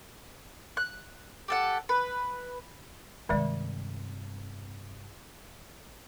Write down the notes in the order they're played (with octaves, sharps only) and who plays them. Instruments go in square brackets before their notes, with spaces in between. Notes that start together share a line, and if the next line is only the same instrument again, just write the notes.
[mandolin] F#6
G4 A4 F#5
B4
[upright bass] G2 C3 [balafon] D#3 G#3 D5